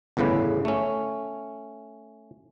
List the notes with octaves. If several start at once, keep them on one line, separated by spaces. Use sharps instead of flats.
G1 E2 A2 C#3 B4
A3 C#4